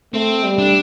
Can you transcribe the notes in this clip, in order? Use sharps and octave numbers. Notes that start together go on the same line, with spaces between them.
A3 C4
G3
D4